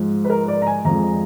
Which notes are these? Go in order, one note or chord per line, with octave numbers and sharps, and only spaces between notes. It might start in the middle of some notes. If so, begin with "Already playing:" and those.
Already playing: G#2 F3 G#3
B4
A#4
D5
A#5
G#5
F2 F3 G#3 A#5